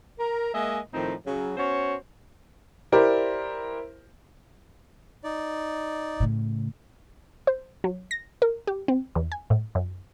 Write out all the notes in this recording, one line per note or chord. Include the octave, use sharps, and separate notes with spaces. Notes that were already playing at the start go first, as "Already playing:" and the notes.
A#4
G#3 A#3 D#5 E5 G#5
A2 D#3 F3 C4 D#4
C#3 F#3
B3 C#4 F#4 C5 C#5
E4 G4 A#4 C5 D5
D#4 D5
A2 C#3
C5
F#3
A#6
A#4
G4
C4
E2
G#5
A2
F#2